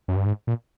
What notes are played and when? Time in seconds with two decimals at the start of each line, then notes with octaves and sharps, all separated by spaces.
0.08 F#2
0.16 G2
0.26 G#2
0.47 A#2